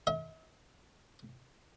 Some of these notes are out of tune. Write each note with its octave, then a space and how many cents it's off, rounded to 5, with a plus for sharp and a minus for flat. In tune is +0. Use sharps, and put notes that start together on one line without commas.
E5 -45